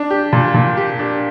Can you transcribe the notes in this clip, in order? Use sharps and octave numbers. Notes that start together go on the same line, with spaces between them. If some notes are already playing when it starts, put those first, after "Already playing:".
Already playing: D4
G4
A#2
A#2
G4
D4